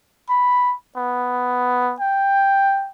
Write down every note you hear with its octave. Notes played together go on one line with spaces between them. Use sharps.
B5
B3
G5